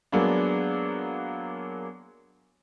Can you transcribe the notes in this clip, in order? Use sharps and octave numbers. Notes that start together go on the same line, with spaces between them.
F#3 G#3 A#3 B3 D4